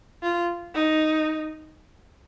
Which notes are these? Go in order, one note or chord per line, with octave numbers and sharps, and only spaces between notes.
F4
D#4